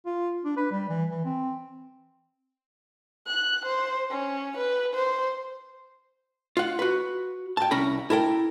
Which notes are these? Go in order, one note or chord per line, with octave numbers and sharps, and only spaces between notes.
F4
D4
B4
G3
E3
E3
C4
F#6
C5
C#4
B4
C5
F4 F#5
F#4 B4
G5 A5
C2 C#4 A#5 B5
E4 A4 A#4 G5